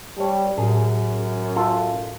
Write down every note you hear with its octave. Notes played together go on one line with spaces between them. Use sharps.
G3 C#5 A5
F#2 A2 G#4
F4 A4